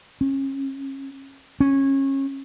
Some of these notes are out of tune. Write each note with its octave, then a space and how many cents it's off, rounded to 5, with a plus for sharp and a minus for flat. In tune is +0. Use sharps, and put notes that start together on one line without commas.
C#4 -30
C#4 -25